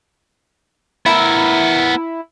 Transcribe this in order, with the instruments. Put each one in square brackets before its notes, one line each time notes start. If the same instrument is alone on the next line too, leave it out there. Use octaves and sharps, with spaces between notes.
[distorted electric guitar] B3 A#4 [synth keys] E4